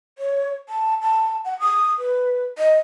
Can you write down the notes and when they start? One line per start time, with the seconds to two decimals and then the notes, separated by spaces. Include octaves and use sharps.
0.18 C#5
0.69 A5
1.01 A5
1.45 F#5
1.59 D#6
1.99 B4
2.58 D#5